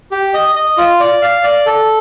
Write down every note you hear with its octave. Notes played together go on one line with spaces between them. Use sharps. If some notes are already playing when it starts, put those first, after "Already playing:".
G4
D#5
D#5
F4
D5
F5
D5
A4